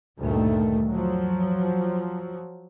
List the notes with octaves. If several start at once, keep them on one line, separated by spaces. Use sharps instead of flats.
D2 G2 A#2 D#3 A3
F3 F#3